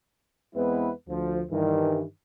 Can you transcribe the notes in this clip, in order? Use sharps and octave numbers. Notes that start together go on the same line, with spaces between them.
E2 G#3 B3 C4 E4 B4
D2 F3
G2 D#3 E3